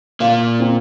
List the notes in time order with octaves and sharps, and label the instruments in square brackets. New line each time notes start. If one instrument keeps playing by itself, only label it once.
[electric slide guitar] A#2 A#3 [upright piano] F5
[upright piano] C4